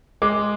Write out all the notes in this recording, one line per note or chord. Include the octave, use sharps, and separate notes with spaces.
G#3 D6